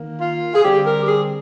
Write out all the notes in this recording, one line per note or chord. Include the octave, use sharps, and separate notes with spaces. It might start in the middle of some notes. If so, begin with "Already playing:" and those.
Already playing: D#3 A#3
F4
G#4
D3 G3 C4 G4
A#4
G4
G#4